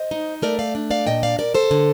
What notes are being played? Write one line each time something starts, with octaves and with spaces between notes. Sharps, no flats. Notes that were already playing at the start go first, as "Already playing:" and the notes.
Already playing: C5 D#5
D#4
A3 A#4 D5
D5 F5
D4
D5 F5
A#2 D#5 G5
D5 F5
A#2 A#4 D5
A4 C5
D3